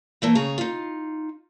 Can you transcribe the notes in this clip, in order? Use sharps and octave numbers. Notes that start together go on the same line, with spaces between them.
E3 A3 A#3
C#3 G#4 C#5 A#5
D#4 F4